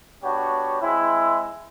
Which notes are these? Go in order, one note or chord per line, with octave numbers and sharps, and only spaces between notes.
B3 D4 F#4 G4 C#5
G#3 C4 E4